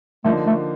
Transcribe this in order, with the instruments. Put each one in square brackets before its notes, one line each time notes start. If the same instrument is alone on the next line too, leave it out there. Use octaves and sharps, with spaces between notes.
[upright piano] D3 F3 A#3 D#4 [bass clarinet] A3
[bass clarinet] A3